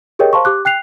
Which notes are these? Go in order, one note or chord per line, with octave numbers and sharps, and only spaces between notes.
G4 G#4 A#4 C#5 D#5 G5
C5 F5 A5 C6 C#6
G4 D6 F#6
G5 F#6 C7 F7